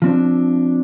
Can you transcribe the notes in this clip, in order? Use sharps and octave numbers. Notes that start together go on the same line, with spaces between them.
F3 C4 D4